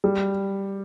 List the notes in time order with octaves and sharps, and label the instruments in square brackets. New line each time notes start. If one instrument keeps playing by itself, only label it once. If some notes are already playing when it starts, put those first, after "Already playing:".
[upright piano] G3